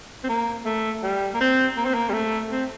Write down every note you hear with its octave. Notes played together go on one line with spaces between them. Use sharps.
C4
A#3
A3
G3
A#3
C4
A#3
C4
A#3
G3
A3
C4